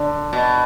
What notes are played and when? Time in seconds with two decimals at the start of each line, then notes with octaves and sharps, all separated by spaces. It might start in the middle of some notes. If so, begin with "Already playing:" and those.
Already playing: D3
0.33 B2